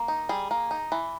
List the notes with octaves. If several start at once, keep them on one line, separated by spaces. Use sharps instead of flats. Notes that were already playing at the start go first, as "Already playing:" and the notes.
Already playing: A#3
D#4
G3 G#4
A#3
D#4
E3